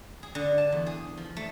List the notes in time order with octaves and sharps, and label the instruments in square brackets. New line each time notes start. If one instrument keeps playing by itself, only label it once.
[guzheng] G#4
D3
A5
E2
G#4
F3
A3